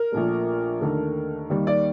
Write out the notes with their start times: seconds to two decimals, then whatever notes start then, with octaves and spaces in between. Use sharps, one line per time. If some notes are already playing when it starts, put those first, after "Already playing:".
Already playing: A#4
0.12 A#1 A#2 A3
0.81 D#2 D3 A3
1.50 D#2 D#3 G3 A#3
1.67 D5